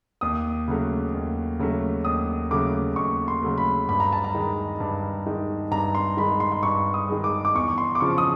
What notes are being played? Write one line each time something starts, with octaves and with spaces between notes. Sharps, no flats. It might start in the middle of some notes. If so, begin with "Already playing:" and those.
D#2 D#6
C#3 F#3 A3
D#2
C#3 F#3 A3
D#2 D#6
C#3 F#3 A3 D6
D#2 C#6
C6
C#3 F#3 A3
B5
G2 B5
A#5
A5
A#5
D#3 G#3
G2
D#3 G#3
G2 A#5
C6
D#3 G#3 B5
C6
C6
G2 C#6
D#6
D#3 G#3
D6
D6
E2 C#6
C6
D6
C#3 F3 C#6
D#6